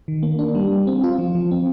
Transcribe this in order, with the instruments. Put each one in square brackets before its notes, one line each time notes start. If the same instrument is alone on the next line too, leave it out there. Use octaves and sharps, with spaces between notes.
[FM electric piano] D#3
A#3
D4
G3
G3
C4
F4
F3
F3
C4